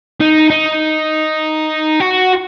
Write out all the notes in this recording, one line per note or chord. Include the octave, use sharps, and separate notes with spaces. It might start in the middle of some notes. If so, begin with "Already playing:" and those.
D#4
D#4
F#4